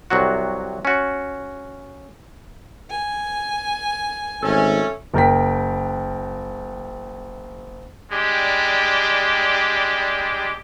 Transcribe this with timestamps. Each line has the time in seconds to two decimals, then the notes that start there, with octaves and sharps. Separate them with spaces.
0.10 C2 C3 F#3 F#4
0.85 C#4 F#4
2.90 G#5
4.43 G#1 A3 C#4 A4
5.14 F#1 A#4 G5 B6
8.12 G3 G#3 D4 G4